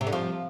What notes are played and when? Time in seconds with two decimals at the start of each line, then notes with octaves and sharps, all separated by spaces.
0.01 C3
0.07 D3
0.12 F3